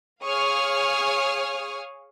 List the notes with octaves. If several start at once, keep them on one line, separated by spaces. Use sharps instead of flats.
G#4 C#5 F5 C#6 D#6 F6